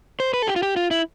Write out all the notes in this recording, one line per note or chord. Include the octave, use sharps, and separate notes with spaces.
C5
B4
A4
G4
F4
G4
F4
E4